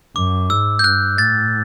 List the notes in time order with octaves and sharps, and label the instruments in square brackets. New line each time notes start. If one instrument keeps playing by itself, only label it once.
[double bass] F#2 [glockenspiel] D6
[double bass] G#2 [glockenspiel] E6
[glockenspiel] G6
[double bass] G2 [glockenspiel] F#6
[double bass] A2 [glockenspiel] A6